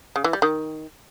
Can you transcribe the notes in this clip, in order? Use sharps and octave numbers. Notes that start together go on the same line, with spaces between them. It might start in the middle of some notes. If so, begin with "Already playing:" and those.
C#3
E3
G3
D#3